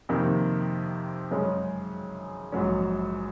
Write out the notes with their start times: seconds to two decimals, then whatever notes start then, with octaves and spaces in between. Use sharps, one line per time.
0.09 F2 C3 D#3 A#3
1.31 F#2 C#3 G#3 C#4
2.52 A#1 G#2 F#3 C#4